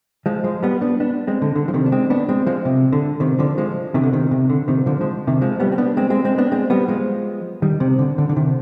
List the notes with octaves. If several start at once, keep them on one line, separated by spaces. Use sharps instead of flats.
F3 G#3
F3 G#3
G3 B3
B3 D4
B3 D4
G#3 C4
D3
D3
F3
C3 D#3
D4
G#3 C4
B3 D4
G#3 C4
F3 G#3
C3
D3
C3 D#3
D3 F3
F3 G#3
C3 D#3
D3
C3 D#3
C3
D3
C3 D#3
D3 F3
F3 G#3
C3 D#3
F3 G#3
G3 B3
C4
B3 D4
G#3 C4
G#3 C4
G#3 C4
B3 D4
G#3 C4
G3 B3
F3 G#3
D#3 G3
C3
D3
D3
D3
C3 D#3